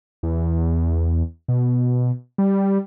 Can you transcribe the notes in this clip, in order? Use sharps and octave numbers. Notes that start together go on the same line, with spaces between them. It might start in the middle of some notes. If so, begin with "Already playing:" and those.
E2
B2
G3